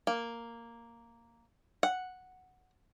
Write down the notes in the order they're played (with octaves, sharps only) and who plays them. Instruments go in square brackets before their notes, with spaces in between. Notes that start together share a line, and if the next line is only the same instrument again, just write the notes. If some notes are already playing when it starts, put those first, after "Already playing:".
[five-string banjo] A#3
F#5